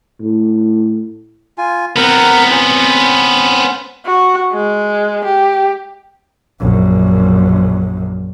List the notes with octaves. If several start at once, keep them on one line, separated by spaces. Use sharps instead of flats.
A2
F4 G#5
B3 C4 A#4 F#5 A#5
C#4 C5
F#4
G#3
G4
A#1 F#2